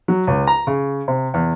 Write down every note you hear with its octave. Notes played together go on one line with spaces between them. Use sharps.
F#3
C#2
A#5
C#3
C3
E2